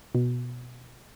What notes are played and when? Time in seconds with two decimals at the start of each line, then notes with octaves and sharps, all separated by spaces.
0.15 B2